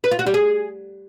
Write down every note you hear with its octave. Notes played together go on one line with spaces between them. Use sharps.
B4
F4
F#4
G3
G#4